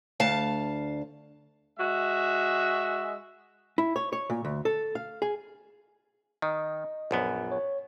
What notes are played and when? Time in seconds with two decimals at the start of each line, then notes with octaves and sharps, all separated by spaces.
0.20 D2 F5 A5
1.80 G#3 F#4 E5
3.78 E4
3.96 C#5
4.13 C#5
4.30 A#2
4.45 D2
4.65 A4
4.95 F5
5.22 G#4
6.42 D#3 D#5
7.11 A#1 F#2 B3
7.52 C#5